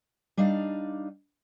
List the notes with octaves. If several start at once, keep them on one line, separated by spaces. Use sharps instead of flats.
G3 D4 D#4 F5